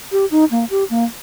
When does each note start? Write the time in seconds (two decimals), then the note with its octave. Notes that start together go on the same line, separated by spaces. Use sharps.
0.12 G4
0.31 D#4
0.51 A#3
0.70 G4
0.90 A#3